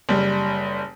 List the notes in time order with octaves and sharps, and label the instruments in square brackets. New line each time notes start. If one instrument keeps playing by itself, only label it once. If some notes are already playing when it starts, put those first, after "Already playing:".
[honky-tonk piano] F#1 G3